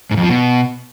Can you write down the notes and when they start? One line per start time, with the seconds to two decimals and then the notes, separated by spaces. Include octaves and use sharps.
0.11 G#2
0.17 F2
0.23 F3
0.29 B2